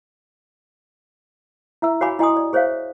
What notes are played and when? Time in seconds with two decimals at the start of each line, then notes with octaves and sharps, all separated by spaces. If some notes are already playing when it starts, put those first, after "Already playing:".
1.82 E4 E5 E6
2.01 F#4 C#5 F5 G#5 B5 D6
2.19 E4 D#5 G#5 C6 D#6
2.37 D5
2.53 G#4 C5 C#5 E5 F5